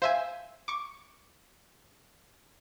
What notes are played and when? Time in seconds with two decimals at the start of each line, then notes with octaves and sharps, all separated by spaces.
0.02 C5 E5 F5 G#5
0.68 C#6 D6